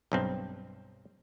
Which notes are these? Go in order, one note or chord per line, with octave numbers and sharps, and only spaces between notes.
B1 G2 C4